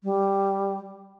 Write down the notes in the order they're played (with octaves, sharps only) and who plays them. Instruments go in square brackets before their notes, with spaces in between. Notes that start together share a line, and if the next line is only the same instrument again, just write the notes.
[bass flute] G3